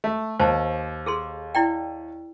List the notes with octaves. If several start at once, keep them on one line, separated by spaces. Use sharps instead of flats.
A3
D#2 C5 A5
G#4 A4 C6
E4 D5 G5